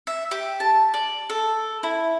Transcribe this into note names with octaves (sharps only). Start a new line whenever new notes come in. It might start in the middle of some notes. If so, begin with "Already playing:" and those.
E5
G4
A5
D5
A4
E4